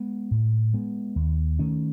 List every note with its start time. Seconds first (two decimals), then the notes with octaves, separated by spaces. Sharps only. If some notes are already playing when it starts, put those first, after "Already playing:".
Already playing: G#3 B3
0.31 A2
0.74 G#3 B3
1.16 D#2
1.59 D#3 A3 C#4